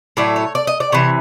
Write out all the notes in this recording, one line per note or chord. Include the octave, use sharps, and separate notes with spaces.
A2 F#3 A3 D5
C#5
D5
D#5
D5
C3 E3 C#5